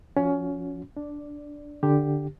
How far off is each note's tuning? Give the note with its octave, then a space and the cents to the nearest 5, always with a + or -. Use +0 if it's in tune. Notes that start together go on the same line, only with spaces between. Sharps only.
F3 -15 C#4 +20 F#4 -30
D4 -5 D5 +0
D3 +0 G4 +0